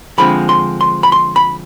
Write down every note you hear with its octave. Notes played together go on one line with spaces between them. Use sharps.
D3 F3 G#3 C4 B5
C6
C6
B5
C6
B5